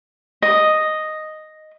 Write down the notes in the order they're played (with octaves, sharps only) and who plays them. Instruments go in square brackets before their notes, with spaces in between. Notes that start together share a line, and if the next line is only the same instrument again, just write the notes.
[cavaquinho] D#5